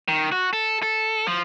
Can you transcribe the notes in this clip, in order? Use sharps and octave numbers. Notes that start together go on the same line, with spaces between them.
D#3
F#4
A4
A4
F3